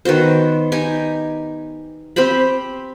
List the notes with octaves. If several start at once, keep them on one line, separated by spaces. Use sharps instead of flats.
D#3 B3 F#4 C5
D#4 G4 G#5
C4 G4 C5 B5